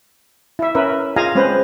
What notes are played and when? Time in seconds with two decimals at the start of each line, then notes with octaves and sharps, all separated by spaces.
0.59 E4 E5
0.75 C#4 A#4 B4 E5
1.16 F4 G#4 D#5 F5 G#5 A#5
1.35 G#3 C4 C#4 B4 C5